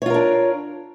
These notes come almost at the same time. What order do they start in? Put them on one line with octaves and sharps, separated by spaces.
C#5 F4 A#4 D4